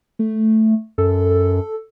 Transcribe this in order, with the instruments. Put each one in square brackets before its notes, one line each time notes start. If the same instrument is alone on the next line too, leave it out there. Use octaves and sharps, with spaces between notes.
[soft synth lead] A3
[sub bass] F#2 [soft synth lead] A4